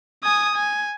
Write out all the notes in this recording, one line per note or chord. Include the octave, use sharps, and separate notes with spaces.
G#5 D#6
G#5